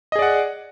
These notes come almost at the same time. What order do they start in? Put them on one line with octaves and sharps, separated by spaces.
D#5 G#4 D5 F#5